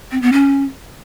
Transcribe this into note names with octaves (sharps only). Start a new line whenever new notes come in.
C4
B3
C#4